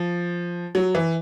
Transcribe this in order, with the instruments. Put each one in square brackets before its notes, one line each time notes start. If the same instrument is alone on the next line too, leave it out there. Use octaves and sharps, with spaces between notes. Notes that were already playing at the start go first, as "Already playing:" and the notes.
Already playing: [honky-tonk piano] F3
F#3
E3